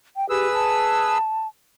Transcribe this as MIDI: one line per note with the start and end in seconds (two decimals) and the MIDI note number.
0.17 0.29 79
0.30 0.49 67
0.30 1.18 68
0.30 1.18 71
0.30 1.18 88
0.54 1.47 81